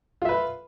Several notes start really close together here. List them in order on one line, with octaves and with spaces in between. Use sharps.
F4 E5 B4